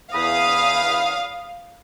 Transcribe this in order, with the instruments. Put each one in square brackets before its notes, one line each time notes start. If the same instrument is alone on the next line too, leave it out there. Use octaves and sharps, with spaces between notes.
[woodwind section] E2 B5 D#6 [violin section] F5